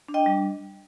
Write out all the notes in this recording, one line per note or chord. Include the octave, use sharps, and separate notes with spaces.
D4
D#5 G5
G3